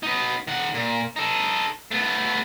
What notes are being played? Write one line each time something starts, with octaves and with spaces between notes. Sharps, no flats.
B3 D#4
D#3 F#5
A#2
D#4 A4
A3 B3